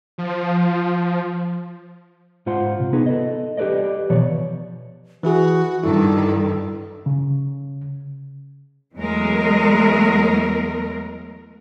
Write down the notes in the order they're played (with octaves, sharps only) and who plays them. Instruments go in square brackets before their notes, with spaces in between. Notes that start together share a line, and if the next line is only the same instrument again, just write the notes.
[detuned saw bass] F3
[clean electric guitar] G#2 F4 C5 F#5 C6
C3
B3 D#4 G#4 B4
A4 D#5
G4 G#4 B4 D5 D#5
B2 E3 F3 C#5 D5
[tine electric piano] E3 E4 G#4 [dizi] F#4
[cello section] G2 D#3 [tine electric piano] E4 [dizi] A4
[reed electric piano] C#3
[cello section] E2 F#3 G#3 A3 A#4